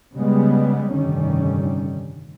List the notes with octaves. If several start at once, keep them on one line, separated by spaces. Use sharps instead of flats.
C#3 G3 G#3 B3
F1 G2 D3 D#3 G3 C#4